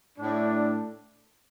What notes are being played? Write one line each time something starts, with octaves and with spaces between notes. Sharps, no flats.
A2 A3 D4